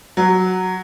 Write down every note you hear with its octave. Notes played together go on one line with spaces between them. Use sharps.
F#3